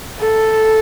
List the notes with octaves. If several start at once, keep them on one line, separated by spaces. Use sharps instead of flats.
A4